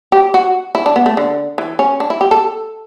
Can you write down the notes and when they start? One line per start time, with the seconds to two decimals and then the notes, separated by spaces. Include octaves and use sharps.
0.12 G4
0.34 F#4
0.75 E4
0.86 D4
0.96 B3
1.06 A3
1.17 D3
1.58 E3
1.79 C#4
2.00 D4
2.10 E4
2.21 G4
2.31 A4